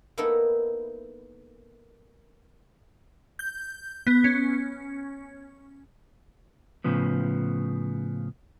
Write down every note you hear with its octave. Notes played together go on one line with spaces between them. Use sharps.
A#3 B3 D#4 E4 A4
G6
B3
C#4
A2 C#3 F3 B3